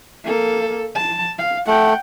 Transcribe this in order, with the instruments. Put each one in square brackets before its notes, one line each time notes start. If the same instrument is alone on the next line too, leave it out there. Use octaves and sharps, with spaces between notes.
[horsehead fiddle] A#3 A4
A5
F5
[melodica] A3 [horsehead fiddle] F#5 G5